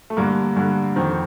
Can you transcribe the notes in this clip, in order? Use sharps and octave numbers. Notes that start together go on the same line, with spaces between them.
A3
G2 D3 A#3
G2 D3
F2 D#3 C4